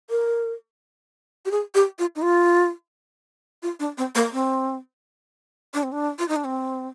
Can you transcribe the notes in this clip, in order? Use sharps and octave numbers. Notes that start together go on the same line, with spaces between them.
A#4
G4
G#4
G4
F4
D#4
F4
F4
D4
C4
A#3
C4
D4
C4
D4
F4
D#4
D4
C4